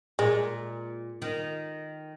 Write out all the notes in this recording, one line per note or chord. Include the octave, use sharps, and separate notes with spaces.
A#2 G#3
D#3